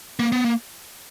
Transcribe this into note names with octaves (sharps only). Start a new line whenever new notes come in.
A#3
B3
A#3